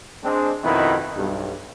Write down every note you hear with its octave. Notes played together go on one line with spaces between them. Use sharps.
G#3 C4 D4
F2 B2 D#3 D#4 E4 B4
B1 G2